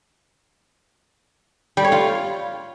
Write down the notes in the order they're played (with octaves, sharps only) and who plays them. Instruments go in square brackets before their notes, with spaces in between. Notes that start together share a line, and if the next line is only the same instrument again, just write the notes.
[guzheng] G3
C#5
F4